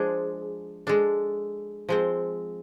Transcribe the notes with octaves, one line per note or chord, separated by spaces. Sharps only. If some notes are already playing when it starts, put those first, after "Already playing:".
Already playing: F3 G#3 D4 G#4
G#3 D4 A4
F3 G#3 C4